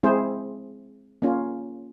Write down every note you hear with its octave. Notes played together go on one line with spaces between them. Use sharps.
G#3 C4 E4 G#4 C5
A#3 C#4 F4